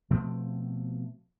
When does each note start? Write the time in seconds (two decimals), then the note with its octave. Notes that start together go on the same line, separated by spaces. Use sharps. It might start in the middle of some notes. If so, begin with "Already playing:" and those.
0.10 B2 F3 A3 C4